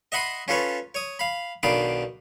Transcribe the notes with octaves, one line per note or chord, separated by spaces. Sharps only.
D#5 E5 F#5 B5 C6 D#6
C#4 F4 A4 B4 C#5
C#5 D#6
F5 B5
B1 B2 D#3 D4 F5 B5